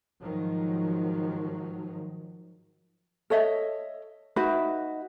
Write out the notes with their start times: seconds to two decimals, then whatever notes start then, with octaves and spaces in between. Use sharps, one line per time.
0.20 G#2 D#3 F3 F#3
3.30 A4 C#5 D#5 E5
4.36 D#4 F#4 B4 E5